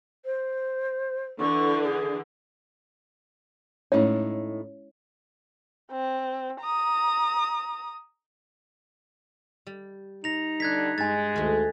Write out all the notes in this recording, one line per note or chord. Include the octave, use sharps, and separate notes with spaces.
C5
D3 E3 C#6
G#4
A2 G#3 C#4 D#4 E4 C#5
C4
A#5 D#6
G3
D#4 A#6 F7
D3 G3 D4 F#6 G#6 B6
G2 G#3 G#5 A6
D2 D#3 A3